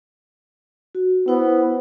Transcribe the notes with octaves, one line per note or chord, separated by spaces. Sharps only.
F#4
B3 E4 C5